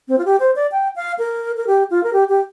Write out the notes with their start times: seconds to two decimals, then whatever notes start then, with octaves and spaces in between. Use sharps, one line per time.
0.08 C4
0.18 F4
0.25 G4
0.40 C5
0.56 D5
0.72 G5
0.96 F5
1.19 A#4
1.56 A#4
1.67 G4
1.91 F4
2.04 A#4
2.13 G4
2.29 G4